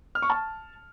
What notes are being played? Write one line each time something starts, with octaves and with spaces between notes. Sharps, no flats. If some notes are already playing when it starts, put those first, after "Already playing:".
F6
C#6
A5